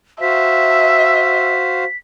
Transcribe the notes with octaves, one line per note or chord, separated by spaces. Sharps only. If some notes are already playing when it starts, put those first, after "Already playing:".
F#4 C5 E5 F5 B6